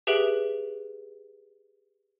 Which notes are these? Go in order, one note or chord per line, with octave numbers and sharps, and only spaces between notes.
G4 G#4 B4 E5 D7 F#7